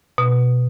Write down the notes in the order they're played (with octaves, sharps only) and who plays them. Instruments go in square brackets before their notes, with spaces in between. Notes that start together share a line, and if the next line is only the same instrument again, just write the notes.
[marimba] B2